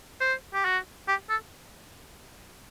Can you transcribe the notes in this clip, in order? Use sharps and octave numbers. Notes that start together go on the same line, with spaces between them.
C5
G4
F#4
G4
A4